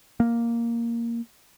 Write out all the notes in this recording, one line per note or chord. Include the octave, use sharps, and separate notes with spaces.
A#3